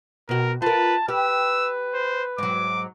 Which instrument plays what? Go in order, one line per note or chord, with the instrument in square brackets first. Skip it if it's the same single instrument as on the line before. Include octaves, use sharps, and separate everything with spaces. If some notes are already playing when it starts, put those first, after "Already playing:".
[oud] B2 F#4 [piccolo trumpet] A#4
[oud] F4 A#4 [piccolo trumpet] B4 [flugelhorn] A5
[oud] G4 [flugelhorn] B4 [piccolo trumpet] E6
[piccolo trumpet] C5
[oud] G#2 F#3 [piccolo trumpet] D6